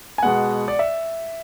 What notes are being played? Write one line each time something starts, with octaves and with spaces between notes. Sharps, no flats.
G#5
B2 G#3 B3 F#5
D5
E5